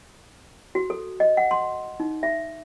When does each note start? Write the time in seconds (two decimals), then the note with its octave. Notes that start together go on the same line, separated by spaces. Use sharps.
0.75 F#4
0.90 A4
1.20 D#5
1.37 F#5
1.51 C6
2.00 D#4
2.23 E5